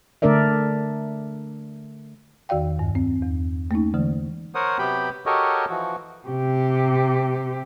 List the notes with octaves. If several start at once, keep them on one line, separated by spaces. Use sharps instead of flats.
D3 A3 D4 A#4 D5 E5
E2 D#3 F#4 D5 F5 G5
D2 G2
C4
E2
A3 A#3 C#4 D#4
D3 E3 G#3
A#4 C5 C#5 F#5 D#6
C3 F#3 B3 G4 G5 B5
F#4 G4 A4 A#4 C#5 D#5
E3 F3 F#4
C3 G4